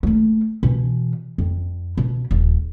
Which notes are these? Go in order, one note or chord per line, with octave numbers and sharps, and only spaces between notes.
A3 A#3
B2 E3
F2
B2
D#1